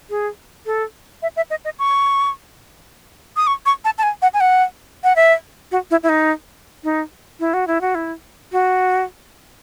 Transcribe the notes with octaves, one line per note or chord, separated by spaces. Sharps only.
G#4
A4
E5
E5
D#5
D#5
C#6
D#6
C#6
C#6
A5
A5
G#5
F#5
G#5
F#5
F#5
E5
F#4
E4
E4
D#4
D#4
E4
F#4
E4
F#4
E4
F#4